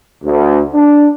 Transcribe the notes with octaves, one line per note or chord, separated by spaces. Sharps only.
D2
D4